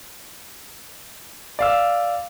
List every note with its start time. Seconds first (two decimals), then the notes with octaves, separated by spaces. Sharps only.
1.59 D5 F5 E6